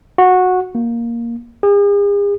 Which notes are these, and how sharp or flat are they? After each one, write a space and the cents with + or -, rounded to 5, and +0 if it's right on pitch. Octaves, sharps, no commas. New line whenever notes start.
F#4 -15
A#3 +5
G#4 -45